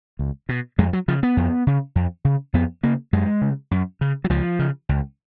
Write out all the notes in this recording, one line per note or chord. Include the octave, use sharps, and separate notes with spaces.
C#2
B2
F2 G#3
F#3
C#3 F3
B3
F2
C#3
F2
C#3
F2 B3
C#3 A#3
F#2 G#3
C#3
F#2
C#3
F#3
C#2 F3
C#3
C#2